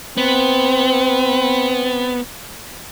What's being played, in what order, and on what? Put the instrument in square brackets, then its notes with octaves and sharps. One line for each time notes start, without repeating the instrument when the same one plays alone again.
[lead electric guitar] B3 [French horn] C4